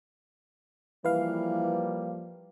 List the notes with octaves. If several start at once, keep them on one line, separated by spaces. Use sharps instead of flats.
E3 F3 G3 A#3 B4 F5